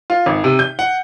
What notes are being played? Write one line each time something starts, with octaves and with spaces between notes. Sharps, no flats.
F4
G#1
C3
G6
F#5